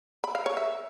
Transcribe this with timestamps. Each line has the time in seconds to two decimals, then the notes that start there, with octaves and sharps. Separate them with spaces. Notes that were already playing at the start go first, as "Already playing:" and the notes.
0.24 B5
0.35 F5
0.46 C#5
0.57 E5